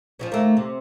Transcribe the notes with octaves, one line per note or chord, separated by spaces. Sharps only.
F3 F#3 C#4
D#2 A3 A#3
C3